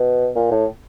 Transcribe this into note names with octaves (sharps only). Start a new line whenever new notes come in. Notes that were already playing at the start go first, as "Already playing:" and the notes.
Already playing: B2
A#2
A2